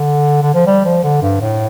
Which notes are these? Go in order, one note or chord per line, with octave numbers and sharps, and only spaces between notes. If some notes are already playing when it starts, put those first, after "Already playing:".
Already playing: D3
D3
F3
G3
F3
D3
G2
A2